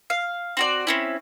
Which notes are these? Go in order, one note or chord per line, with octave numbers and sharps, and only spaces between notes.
F5
C4 F#4 D5
C4 C#4 E4